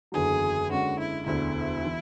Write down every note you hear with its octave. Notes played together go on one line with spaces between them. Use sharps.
F#1 E2 D3 F#3 G#4
D3 G#3 C#4 F#4
E4
E1 D2 D3 E4
E3